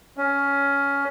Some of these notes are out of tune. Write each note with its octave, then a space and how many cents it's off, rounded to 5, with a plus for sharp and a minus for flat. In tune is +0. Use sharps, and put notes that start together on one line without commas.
C#4 +15